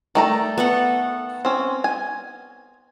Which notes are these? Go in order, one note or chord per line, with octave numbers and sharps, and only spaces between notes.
D#3 A3 D5 A#5
B3 A4 F#5
C4 C#4
G#5